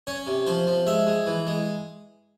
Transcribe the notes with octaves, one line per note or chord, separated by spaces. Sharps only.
C#4 C#5
C3
F3 C5
F3
G#3 E5
G#3
E3
G#3